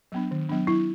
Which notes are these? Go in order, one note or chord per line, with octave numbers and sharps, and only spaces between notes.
F#3 B3 D4
D#3
F#3 B3 D4
F#3 E4